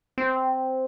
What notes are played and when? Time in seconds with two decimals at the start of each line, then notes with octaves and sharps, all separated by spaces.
0.18 C4